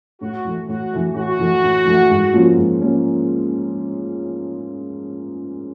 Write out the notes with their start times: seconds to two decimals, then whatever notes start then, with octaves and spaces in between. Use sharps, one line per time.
0.21 A2 F#4
0.45 E3 A3
0.68 A2 F#4
0.93 E3 A3
1.15 A2 F#4
1.39 E3 A3
1.63 A2
1.85 E3 A3
2.10 G#2
2.33 F3 A#3 C#4 F4
2.56 G#2
2.80 F3 A#3 C#4 F4